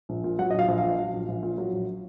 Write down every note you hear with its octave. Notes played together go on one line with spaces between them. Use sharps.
A#1
A#2
F#3 F#5
D#5
A#1 F5
A#1
F5
A#2
F#3
A#1
A#1
A#2
F#3
A#1